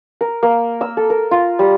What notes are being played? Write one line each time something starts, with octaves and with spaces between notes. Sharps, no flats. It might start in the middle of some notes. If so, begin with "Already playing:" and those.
A#4
A#3
E6
A4
A#4
F4
G3